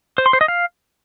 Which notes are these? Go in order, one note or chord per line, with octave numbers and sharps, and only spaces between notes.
C5
C6
C5
D#5
F5